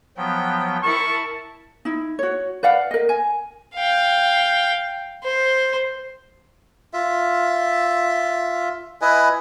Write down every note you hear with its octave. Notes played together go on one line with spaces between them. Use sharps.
F3 F#3 B3 G5
E4 A#4 A5 C#6
D#4 E4
F#4 C#5
B4 D5 F5 F#5
A#4 D#5
G#5
F5 G5
C5
F4 E5
E4 B4 D#5 G#5